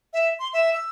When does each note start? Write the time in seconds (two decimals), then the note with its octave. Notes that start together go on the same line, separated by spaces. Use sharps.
0.13 E5
0.39 C6
0.53 E5
0.73 E6